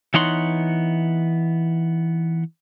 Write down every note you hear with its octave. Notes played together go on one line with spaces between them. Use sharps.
E3 B3 D#4 C#5 F#5 C6